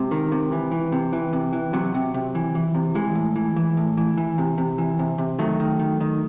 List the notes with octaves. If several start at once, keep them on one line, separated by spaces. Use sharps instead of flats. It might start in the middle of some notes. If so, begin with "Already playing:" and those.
Already playing: C3 G#3
D#3
C3
E3
E3
C3
E3
C3
E3
C3 F#3
C3
C3
E3
E3
C3
E3 G#3
A2
E3
E3
A2
E3
E3
C3
C3
E3
C3
C3
D#3 F#3 A3
D#3
D#3
D#3